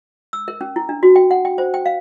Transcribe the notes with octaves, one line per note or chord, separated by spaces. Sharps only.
E6
A#4
C#4
E4
D4
F#4
G5
F#5
G5
C5
G5
F5